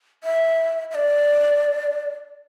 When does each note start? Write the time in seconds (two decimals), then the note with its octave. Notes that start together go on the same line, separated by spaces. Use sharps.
0.24 E5
0.91 E5
0.95 D5